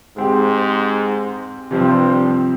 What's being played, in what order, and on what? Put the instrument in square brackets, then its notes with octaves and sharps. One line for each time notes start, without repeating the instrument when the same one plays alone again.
[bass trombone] G#2 [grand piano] G#3 C4 G4
[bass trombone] G2 [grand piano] C3 F3 C4